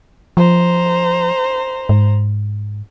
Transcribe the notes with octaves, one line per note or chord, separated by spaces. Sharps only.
F3 C5 A#5
G#2